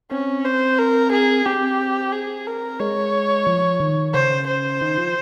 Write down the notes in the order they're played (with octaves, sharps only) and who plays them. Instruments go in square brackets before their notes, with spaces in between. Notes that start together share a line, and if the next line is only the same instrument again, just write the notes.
[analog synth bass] C4 [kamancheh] C#4
[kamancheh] C5
A#4
G#4
[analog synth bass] C4 [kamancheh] G4
[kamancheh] G#4
A#4
[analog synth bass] G#3 [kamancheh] C#5
[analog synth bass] F3
D#3
[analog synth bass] C#3 [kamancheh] C5
[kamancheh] C5
[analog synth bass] D#3
F3